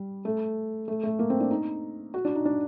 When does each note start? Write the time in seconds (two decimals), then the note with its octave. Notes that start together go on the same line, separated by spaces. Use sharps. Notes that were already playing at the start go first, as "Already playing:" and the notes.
Already playing: G3
0.25 A3
0.88 A3
1.03 A3
1.19 A#3
1.30 C4
1.40 D4
1.51 D#4
2.14 F#4
2.25 D4
2.35 D#4
2.45 D4